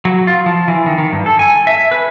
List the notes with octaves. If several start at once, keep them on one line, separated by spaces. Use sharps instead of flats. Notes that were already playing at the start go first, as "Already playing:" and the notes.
F#3
F4
F3
E3
D#3
D#3
G2
A4
G#5
E5
B4